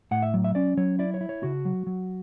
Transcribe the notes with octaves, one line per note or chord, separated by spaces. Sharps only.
A2 F#5
E5
F#3
E5
C#4 D5
F#3 C#5
E4 D5
C#5
E4
C#5
C#3 F#4
F#3
F#3